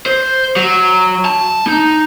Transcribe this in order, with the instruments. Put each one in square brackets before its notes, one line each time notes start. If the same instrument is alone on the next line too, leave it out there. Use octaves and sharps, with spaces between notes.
[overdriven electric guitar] C5
F#3
A5
D#4